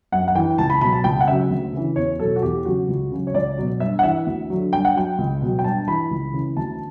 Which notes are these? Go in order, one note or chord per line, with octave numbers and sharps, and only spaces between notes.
F#2 F#5
F#5
E3 G5
C#2 A5
B5
B2 F#3 B5
A5
C#2 G5
F#5
C#3 F#3 E5
D2
C#3 E3
E2 C#5
B2 F#3 A4
F#4
E2 G4
C#3 F#3 F#4
C#2
C#3 F#3
C#5
C#2 D5
B2 F#3
G2 E5
F#5
E3 E5
D2
D3 F#3
G2 G5
F#5
F#3 G5
C#2
B2 F#3
G5
G2 A5
E3 B5
C#2
C#3 E3
D2 A5